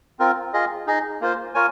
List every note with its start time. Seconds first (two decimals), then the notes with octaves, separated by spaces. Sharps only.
0.19 C4 F4 A#4
0.53 F4 G#4 D#5
0.87 D#4 G#4 D#5
1.21 A#3 F4 C5
1.55 F4 A#4 C#5 G#5